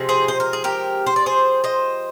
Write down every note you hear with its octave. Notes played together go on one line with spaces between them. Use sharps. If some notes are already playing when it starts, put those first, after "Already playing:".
Already playing: C3 F3 G#3
G#4 C5
C5
A#4
G#4
G4 A#4
C5
D5
G#4 C5
C5 D#5